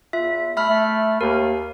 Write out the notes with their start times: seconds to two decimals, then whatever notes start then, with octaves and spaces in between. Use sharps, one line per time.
0.13 E2 F4 E5
0.57 A3 E5 B5 F6
0.69 A3
1.21 D#2 A#4